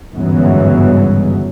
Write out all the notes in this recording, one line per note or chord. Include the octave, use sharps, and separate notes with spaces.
G1 E2 G#2 C#3 E3 F#3